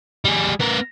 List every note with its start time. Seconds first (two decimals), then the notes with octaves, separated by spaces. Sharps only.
0.25 G3 G#4
0.60 B3 A#4